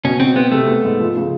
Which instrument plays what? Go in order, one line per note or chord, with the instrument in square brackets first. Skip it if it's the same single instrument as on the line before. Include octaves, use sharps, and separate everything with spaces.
[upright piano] B2 [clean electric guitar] C#4
[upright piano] B2 [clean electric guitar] C4
[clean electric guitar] B3 [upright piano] C4
[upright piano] C3 [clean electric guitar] A3
[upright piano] B3
G#2
F3
C#3